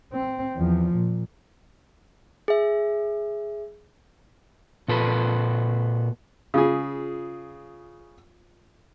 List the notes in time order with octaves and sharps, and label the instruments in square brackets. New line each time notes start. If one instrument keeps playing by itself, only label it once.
[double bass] C4
E2 F3
A#2
[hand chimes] G#4 E5
[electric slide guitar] A#2 A4 B4
[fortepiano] C#3 G#4 [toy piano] F4 F5 D#6